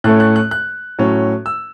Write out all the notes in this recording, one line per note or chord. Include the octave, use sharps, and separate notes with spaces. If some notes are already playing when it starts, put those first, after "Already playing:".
A2 A3 C#4 F#6
F#6
F#6
F#6
A2 F#3 C#4
E6